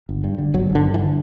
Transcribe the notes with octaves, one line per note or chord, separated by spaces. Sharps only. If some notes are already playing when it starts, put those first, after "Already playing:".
G1
G2
D3
G1 F#3
G1
D3
G2
E3
D3